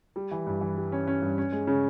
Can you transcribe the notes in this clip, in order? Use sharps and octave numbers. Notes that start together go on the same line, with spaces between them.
G3
E3
G2
E3
G3
C#4
C#4
G2
C#4
G#3
C#3